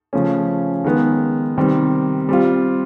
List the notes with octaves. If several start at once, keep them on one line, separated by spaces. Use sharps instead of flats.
C#3 F3 A3 C#4
D#3 G#3 B3
C3 D#3 G3 C4
G3 C4 F4